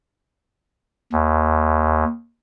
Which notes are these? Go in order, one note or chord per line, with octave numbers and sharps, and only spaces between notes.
D#2